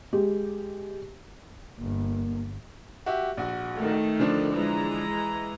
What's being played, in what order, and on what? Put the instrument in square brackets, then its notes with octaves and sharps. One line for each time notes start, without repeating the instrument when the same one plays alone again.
[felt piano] G#3 G4
[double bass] G1 [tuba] A#3
[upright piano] F#4 G4 E5
A#1 F#4
[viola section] D#3 A3
[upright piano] D3 F3 D4
[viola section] E3 G#3 A#5